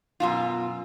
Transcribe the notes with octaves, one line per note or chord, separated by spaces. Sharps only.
F#2 B2 F4